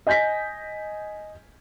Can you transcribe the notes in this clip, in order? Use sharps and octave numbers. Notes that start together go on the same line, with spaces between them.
D#5 G#5 G6 A#6 B6